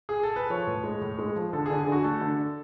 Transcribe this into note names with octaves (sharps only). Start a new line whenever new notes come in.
G#4
A4
B4
F3 C#5
A2
G#3
A2
G#3
F3
D3 A4
G#4
D3
G#4
D3 F#4
A3 A4
D3